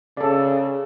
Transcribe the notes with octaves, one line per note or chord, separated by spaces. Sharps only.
C#3 A4 D5